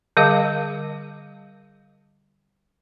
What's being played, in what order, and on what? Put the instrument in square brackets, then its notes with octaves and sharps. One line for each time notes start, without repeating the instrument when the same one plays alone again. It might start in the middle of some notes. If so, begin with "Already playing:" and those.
[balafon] D3 G3 G#4 D#5 F5 D6